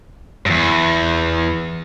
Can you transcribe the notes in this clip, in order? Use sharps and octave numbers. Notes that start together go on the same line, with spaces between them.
E2 G2